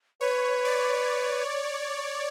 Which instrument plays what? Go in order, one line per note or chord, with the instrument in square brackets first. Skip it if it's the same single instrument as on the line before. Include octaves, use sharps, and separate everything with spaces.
[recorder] B4 [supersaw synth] C#5
[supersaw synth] D5